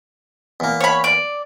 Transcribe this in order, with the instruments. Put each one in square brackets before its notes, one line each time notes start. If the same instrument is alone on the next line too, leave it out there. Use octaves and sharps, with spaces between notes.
[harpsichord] E2 A#3
[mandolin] C#5 B5
D5